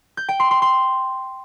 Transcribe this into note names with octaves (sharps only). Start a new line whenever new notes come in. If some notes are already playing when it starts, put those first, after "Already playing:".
G6
G5
C6
C6
C6